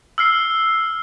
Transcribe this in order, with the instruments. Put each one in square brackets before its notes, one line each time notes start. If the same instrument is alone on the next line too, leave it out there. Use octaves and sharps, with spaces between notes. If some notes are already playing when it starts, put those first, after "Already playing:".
[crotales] E6 F6 C7